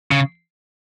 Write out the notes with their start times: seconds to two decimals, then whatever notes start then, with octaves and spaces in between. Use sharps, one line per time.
0.11 C#3